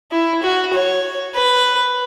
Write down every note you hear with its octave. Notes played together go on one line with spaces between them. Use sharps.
E4
F#4
C#5
B4